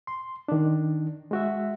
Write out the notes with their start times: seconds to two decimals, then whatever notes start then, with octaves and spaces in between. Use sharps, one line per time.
0.07 C6
0.48 D#3 D4
1.31 G#3 F#4 E5